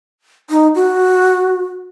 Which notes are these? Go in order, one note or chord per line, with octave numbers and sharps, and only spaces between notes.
D#4
F#4